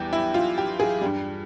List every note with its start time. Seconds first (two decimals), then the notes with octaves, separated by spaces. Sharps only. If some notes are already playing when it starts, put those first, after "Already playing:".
Already playing: E2 E3 G3 G4
0.13 E4
0.34 F4
0.58 G4
0.80 G#4
1.01 G2 G3